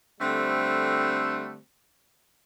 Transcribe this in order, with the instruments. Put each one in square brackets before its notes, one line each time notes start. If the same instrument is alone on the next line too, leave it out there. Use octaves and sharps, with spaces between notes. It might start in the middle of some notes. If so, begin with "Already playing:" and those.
[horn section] D3 G3 A3 C4